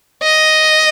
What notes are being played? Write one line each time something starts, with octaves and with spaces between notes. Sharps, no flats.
D#5